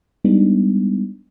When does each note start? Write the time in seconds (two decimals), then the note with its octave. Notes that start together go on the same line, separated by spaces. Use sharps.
0.25 G3 G#3 B3 D4 D#4